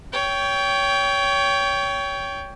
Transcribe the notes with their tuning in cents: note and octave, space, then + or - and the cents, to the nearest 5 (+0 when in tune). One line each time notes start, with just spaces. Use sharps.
C#5 +25 G5 +0